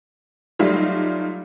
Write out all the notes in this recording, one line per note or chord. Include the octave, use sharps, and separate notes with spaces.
F#3 G3 A3 D#4 F4